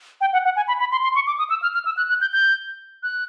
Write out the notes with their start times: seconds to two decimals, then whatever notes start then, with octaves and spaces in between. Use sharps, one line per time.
0.21 G5
0.33 F#5
0.45 F#5
0.56 G#5
0.68 B5
0.80 B5
0.92 C6
1.03 C6
1.15 C#6
1.27 D6
1.38 D#6
1.50 E6
1.62 F6
1.74 F6
1.85 E6
1.97 F#6
2.09 F#6
2.21 G6
2.33 G6
3.03 F#6